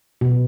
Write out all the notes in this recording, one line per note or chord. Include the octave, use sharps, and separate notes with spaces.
B2